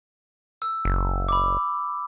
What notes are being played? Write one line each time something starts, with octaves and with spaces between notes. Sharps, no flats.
E6
F#1
B5 D6